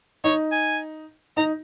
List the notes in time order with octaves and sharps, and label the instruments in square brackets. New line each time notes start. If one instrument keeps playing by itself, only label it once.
[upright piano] D#4 [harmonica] C#5
[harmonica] G#5
[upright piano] D#4 [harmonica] A#5